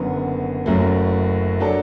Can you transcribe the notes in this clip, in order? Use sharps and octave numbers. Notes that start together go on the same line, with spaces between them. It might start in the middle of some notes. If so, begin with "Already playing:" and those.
Already playing: F#1 F#2 D3 B3
F#1 F#2 F#3 A3
F#3 D4 A4